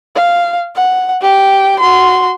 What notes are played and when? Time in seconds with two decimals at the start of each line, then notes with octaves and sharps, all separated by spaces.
0.16 F5
0.75 F#5
1.22 G4 G5
1.80 F#4 C6